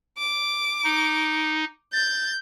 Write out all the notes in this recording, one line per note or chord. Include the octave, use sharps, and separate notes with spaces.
D6
D#4
G6 A6